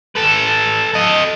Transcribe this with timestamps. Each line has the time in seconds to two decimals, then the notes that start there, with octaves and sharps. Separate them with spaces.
0.16 A4 B4
0.94 A4 D#5